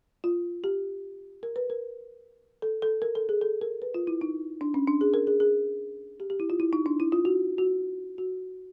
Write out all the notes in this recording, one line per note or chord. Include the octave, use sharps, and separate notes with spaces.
F4
G4
A#4
B4
A#4
A4
A4
A#4
A4
G#4
A4
A#4
B4
F4
E4
D#4
D4
C#4
D4
G#4
A#4
G#4
G#4
G4
G4
E4
F4
E4
D#4
D4
E4
F4
F#4
F#4
F#4